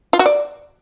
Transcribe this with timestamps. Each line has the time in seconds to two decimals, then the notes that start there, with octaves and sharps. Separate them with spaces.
0.13 F4
0.19 F#4
0.26 D5